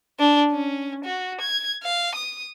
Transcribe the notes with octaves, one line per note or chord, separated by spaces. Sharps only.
D4
C#4
F#4
G#6
F5
D#6